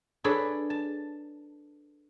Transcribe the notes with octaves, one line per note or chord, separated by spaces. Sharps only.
D4 G#4 A4 B4 C#5
A5